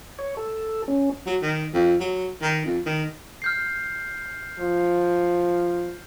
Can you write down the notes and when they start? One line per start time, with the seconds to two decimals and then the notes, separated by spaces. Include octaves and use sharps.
0.19 C#5
0.37 A4
0.88 C#4
1.26 F#3
1.42 D#3
1.73 F2
2.00 F#3
2.42 D#3
2.65 F2
2.86 D#3
3.42 F6 G6 C7
4.59 F3